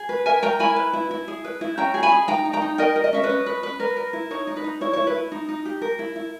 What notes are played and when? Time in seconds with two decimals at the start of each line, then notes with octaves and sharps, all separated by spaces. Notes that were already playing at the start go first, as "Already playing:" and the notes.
Already playing: G#4
0.09 B4
0.26 A#4 E5 G#5
0.43 A#4 G5 A#5
0.59 E4 G#5 B5
0.76 B4
0.93 E4
1.11 E4
1.28 G#4
1.44 B4
1.61 E4
1.78 C#4 G5 A#5
1.94 G#4
2.03 G#5 B5
2.12 G#4
2.28 D#4 G5 A#5
2.45 D#4
2.53 G5 A#5
2.62 D#4
2.78 A#4 D#5 G5
2.96 A#4
3.04 D#5
3.13 C#4 E5
3.24 B4 D#5
3.29 C#4
3.46 B4
3.63 B4
3.80 A#4 B4
3.97 A#4
4.13 E4
4.31 D#4 C#5
4.47 D#4
4.56 B4
4.64 D#4
4.81 E4 C#5
4.93 C#5
4.97 E4
5.07 B4
5.15 E4
5.32 D#4
5.49 D#4
5.65 G4
5.82 A#4
5.99 E4
6.16 E4